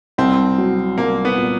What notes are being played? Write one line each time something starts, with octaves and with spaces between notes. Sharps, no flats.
C2 C4
F#3
C2 A#3
B3
A#2